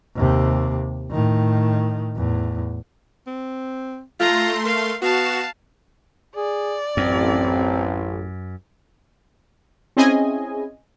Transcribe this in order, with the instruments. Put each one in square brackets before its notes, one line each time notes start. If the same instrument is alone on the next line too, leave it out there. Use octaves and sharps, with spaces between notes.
[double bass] D#2 C3
A2 D#3
E2 A2
[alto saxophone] C4
[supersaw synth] A3 C6 [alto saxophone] F4 [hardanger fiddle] A#5
[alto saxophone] A#4 [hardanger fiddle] F5
[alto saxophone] B3 [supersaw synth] F#4 E7 [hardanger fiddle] F5 A5
[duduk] G#4 [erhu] D5
[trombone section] A1 [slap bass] F#2 [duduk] C4
[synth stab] C4 C#4 E4 G#4 D#5 G#5